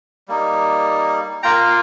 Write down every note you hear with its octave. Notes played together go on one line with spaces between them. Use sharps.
G3 A#3 D#4
A#3 F4 G5 A#5